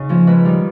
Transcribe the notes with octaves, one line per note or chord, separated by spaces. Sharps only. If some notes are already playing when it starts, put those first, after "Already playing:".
Already playing: C#3 D#4
F3 A#3 C#4
G#2 B4
D#3 G3